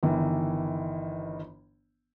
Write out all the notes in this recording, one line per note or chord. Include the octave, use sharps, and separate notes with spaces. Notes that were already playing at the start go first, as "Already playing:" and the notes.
G1 D#3 E3